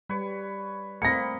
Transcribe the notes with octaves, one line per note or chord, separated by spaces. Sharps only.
G3 B4 C#5
A3 A#3 C4 D#5 B5 A#6 C#7